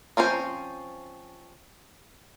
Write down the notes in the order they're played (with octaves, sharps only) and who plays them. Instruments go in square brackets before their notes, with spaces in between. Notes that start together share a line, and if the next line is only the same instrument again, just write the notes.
[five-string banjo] F3 C4 C#4 C5